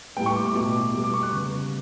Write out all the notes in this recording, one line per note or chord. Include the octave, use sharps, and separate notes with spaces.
A2 G3 B3 G5
C#6
D6
C#6
B2 A3 D6
B2 G3 B3 D6
D6
C#6
F#6
C#3 G3 B3